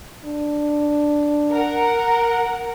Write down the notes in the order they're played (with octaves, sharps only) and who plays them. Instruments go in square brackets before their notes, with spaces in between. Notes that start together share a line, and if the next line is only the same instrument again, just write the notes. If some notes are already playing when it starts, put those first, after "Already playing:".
[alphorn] D4
[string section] A#4 F#5